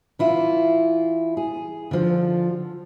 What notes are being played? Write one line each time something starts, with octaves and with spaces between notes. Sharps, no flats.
E3 E4 F4
G#4
D3 F3 F4